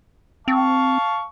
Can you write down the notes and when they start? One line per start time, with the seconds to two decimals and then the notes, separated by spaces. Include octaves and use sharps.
0.48 C4 F5 A5 C#6